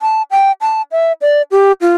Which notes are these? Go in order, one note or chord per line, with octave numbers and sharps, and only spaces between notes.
A5
G5
A5
E5
D5
G4
F4